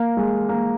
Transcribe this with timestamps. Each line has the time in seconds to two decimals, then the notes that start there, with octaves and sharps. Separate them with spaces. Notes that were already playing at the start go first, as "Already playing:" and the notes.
Already playing: A#3
0.17 G#3
0.49 A#3